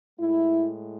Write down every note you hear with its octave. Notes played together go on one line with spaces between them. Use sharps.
A2 G#3 E4